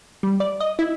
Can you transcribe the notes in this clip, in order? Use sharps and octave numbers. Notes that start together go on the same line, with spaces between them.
G3
D5
D#5
E4